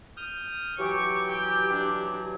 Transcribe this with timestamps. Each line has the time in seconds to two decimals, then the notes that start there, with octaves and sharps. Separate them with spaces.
0.17 D#6 F6 G6
0.78 E3 F#3 G4 C#6
1.29 G5
1.73 D4